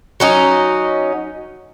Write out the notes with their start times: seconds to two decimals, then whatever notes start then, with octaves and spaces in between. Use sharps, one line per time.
0.20 F#3 C#4 D#4